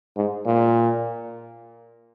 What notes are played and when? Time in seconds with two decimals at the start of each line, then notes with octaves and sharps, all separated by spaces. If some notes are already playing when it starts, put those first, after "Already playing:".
0.17 G#2
0.46 A#2